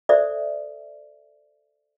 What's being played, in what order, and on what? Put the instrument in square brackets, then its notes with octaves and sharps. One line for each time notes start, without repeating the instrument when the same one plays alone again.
[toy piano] A4 C5 D5 E5